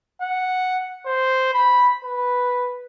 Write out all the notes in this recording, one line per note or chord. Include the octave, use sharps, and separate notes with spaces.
F#5
C5
B5
B4